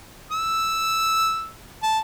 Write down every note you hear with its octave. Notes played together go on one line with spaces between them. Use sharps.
E6
A5